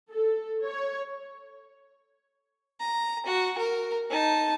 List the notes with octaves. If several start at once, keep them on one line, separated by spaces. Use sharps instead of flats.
A4
C#5
A#5
F#4
A#4
D#4 A5